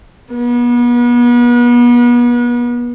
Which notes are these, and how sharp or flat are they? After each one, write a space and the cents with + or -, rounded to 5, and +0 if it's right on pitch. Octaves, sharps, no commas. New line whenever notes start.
B3 -35